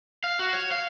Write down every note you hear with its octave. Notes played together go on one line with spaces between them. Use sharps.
F5
F#4
C#5
F5